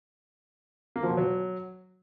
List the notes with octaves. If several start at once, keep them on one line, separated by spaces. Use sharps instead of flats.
A#3
F3
B2
F#3